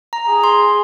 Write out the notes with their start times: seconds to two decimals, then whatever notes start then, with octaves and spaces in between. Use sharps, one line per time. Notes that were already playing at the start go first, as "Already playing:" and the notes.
0.13 A#5
0.28 G#4
0.44 C6